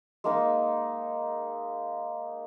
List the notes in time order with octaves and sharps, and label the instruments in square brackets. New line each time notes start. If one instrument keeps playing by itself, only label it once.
[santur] G#3 A#3 D#4